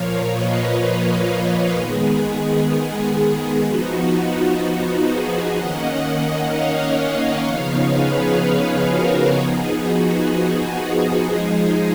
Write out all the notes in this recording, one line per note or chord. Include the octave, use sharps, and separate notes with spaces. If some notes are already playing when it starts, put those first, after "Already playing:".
Already playing: A#2 F3 A#3 C#5 F5
B4 D#5
B4 D#5
D#3 G#3 B3 G#4
G#4
F3 B3 D#4 F#4
F#4
G#4
D#3 A#3 C#4 D#5 F#5
C#5 F5
D#5 F#5
C#3 F3 B3 D#4 C#5 F5
G#4 B4
F#4 A#4
F3 B3 D#4 G#4
F#4
G#4
F3 G#3 D#4